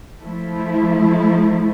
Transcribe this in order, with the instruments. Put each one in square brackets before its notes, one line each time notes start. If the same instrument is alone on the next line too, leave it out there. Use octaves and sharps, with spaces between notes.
[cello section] F3 A3 E4